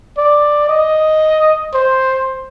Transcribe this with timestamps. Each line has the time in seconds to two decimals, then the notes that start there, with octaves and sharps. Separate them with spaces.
0.18 D5
0.69 D#5
1.74 C5